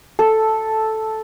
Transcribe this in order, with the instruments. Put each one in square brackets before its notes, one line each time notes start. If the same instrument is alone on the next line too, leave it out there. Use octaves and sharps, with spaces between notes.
[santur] A4